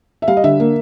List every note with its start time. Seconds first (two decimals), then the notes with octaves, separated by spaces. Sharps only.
0.22 E5
0.28 G3 F5
0.37 D#5
0.44 D3 E5
0.60 A#3